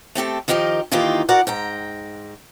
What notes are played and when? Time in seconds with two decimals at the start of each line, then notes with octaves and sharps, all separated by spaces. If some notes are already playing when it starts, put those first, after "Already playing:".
0.15 A3 C4 G4 A4
0.48 D#3 F3 D#4 G4 A#4
0.92 D#3 E3 A#3 D#4 F4 G4
1.29 F#4 A#4 D5 F#5
1.47 G#2 G5 A#5